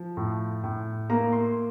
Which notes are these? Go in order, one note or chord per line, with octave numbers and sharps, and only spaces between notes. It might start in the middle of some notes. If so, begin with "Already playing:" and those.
Already playing: F3
A2
A2
A#3 A#5
C6